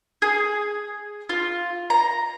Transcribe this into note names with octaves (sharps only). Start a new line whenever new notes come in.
G#4
F4
A#5